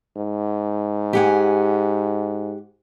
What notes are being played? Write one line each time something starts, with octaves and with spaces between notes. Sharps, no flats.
G#2
G4 F#5 G#5